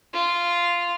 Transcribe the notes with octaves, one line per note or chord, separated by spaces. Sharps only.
F4